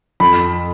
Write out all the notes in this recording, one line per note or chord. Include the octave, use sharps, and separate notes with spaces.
F2 B5